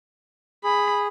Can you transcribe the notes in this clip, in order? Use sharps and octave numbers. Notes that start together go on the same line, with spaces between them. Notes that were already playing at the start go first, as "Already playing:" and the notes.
G#4 B5